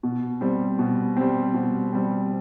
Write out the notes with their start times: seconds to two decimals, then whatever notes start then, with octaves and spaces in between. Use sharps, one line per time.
0.03 B2
0.41 G3 C4
0.79 B2
1.17 G3 C4
1.54 B2
1.93 G3 C4